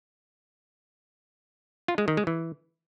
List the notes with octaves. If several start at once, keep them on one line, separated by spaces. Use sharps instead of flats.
F4
G#3
D#3
G#3
E3